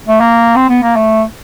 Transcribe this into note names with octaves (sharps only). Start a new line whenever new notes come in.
A3
A#3
C4
B3
A#3
A3